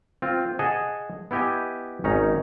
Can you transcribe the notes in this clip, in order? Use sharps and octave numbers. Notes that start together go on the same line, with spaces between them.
C4 F4
G#4 D#5 F#5 G#5 A5
B3 E4 G4 D#5 G#5
G#1 C#4 D#4 A#5